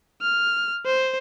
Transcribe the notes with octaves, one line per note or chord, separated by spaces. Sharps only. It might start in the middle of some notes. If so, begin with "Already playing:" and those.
F6
C5